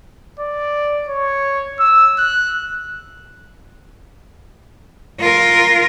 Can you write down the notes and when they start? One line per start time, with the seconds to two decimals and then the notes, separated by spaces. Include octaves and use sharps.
0.39 D5
1.09 C#5
1.79 E6
2.18 F#6
5.20 F4 A#4